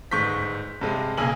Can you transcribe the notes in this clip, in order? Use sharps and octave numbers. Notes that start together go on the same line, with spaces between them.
G1 G#2 C#6 G6 B6
G2 C3 G#3
B1 C#3 A#3 G#5 F#7